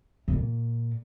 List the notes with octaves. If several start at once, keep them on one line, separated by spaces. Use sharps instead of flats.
C3
A#2